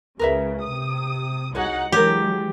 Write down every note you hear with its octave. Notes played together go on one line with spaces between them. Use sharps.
C#2 C#3 A#4 B4 E5
C3 D#6
C2 D#4 F#4 G#4 C#5 F#5
E3 F#3 G#3 G4 A#4 C#5